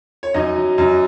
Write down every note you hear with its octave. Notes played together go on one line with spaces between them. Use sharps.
C#5
F#2 D#4 D#5
F#3
F#2